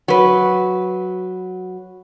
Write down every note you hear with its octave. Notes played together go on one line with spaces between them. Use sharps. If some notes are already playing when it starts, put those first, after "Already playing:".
F#3 B4